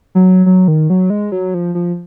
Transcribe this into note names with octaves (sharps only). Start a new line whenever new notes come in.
F#3
F#3
D#3
F#3
G#3
F#3
F3
F3